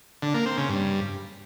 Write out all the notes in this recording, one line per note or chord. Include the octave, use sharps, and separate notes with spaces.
D3
A#3
C4
C#3
G2